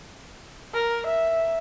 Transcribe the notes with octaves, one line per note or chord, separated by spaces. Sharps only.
A#4
E5